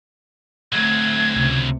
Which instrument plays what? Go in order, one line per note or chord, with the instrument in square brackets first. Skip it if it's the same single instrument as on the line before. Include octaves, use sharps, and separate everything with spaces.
[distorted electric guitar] D2 F#3 [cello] A3 C4 [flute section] G#6
[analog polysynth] C#2 C3